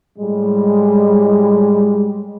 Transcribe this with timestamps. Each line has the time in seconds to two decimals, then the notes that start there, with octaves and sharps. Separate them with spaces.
0.19 A2 G3 G#3